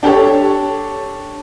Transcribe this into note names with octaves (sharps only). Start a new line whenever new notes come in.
D4 G4 A4 C#5